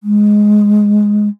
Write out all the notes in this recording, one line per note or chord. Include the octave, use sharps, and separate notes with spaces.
G#3